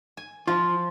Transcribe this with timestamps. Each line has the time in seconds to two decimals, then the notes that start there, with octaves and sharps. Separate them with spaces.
0.17 G#5
0.48 F3 F4